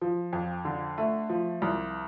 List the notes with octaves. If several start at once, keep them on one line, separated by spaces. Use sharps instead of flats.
F3
F2
D3
A3
F3
C2